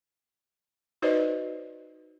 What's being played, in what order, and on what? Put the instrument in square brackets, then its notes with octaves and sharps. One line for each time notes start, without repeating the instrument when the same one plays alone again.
[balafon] D#4 F#4 B4 C5 D5 D#5